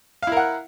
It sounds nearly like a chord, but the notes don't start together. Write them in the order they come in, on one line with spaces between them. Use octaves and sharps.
F5 E4 A#4 F#5